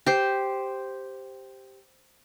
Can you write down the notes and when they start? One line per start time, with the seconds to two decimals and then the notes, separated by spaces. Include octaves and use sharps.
0.06 G4 C5